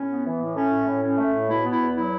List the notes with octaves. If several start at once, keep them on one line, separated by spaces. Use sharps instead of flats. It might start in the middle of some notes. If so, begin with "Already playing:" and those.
Already playing: A2 C#4
B3
E3
A2
A3 C#4
A2
A2
C#4
A3
A2
B2 E4
B3
E4
E2
F#3 E4